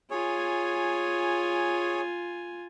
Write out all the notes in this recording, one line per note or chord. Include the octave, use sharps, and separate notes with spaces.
F4 G#4 C#5 G#5